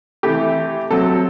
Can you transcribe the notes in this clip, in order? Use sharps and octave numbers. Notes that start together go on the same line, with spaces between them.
C3 E3 A3 G4
C3 F#3 C4 A4